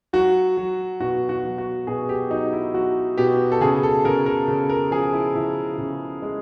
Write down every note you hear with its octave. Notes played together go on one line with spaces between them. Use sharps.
F#3 F#4
F#3
B2 F#4
F#4
F#3
F#4
B2 G#4
G4
F#3 D#4
E4
F#3 F#4
B2 G4
A4
C#3 G#4
A4
C#3 A#4
A#4
C#3
A#4
F3 G#4
E4
C#3 E4
C#3
G#3